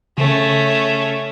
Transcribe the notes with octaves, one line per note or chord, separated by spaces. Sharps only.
C#3 A3 C#4